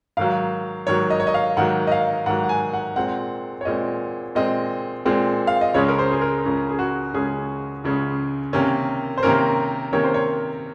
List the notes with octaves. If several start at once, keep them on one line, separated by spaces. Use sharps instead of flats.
G#2 D#3 F#3 F5
G#2 D#3 F#3 C#5
D#5
C#5
D#5
F5
G#2 D#3 F#3 F#5
D#5
F5
G#2 D#3 F#3 F#5
F#5
G#5
F#5
A#2 G#3 C4 F#5
C#5
A#2 G#3 C4 D#5
A#2 G#3 C4 D#5
A#2 G#3 C4
F5
D#5
C#2 C#3 G#3 C#4 C#5
A#4
C5
G#4
A#4
C#2 C#3 G#3 C#4
G#4
F#4
C#2 C#3 G#3 C#4 G#4
C#2 C#3 G#3 C#4
C3 D#3 A#3 C#4
C5
C3 D#3 A#3 C#4 A#4
C3 D#3 A#3 C#4 C#5
C5
C#5